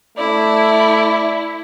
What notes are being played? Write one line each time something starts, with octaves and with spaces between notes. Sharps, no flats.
A3 E4 D5